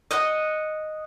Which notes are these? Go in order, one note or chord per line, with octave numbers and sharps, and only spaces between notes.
D#5 F#5